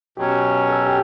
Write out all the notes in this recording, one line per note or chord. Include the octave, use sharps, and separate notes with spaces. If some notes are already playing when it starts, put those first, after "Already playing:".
B2 F#3 C#4 G4
A4
G4